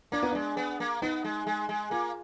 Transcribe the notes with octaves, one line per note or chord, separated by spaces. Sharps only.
A#3 D4
B3
G#3 D4
B3
A#3
B3 D#4
G#3
G#3
G#3
A#3 F4